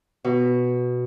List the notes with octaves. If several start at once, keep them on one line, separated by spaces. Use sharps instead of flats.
B2